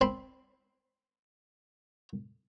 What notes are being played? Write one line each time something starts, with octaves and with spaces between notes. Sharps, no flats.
C4 B5 C6